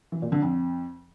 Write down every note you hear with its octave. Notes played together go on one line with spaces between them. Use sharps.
E3
A#2
D3
F2